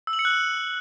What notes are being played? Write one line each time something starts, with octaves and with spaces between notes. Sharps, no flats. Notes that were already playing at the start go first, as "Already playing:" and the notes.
E6
F#7
C#7
F#6
F#7